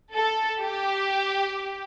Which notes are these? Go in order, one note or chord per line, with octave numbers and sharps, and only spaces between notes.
A4
G4